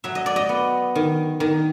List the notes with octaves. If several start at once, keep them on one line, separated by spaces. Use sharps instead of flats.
F#3 E5
D#5
D5
D#5
B3
D#3
D#3